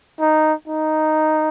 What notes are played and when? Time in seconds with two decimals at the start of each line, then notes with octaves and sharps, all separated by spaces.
0.20 D#4
0.68 D#4